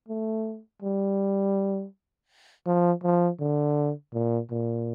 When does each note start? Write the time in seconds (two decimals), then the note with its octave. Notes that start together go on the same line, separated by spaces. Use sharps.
0.08 A3
0.82 G3
2.66 F3
3.03 F3
3.40 D3
4.14 A#2
4.51 A#2